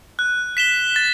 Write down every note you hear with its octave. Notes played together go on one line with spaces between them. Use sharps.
F#6
B6 E7 G7
A6